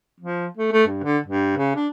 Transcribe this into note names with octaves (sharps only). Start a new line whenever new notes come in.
F3
A3
A3
G2
D3
G2
C#3
D4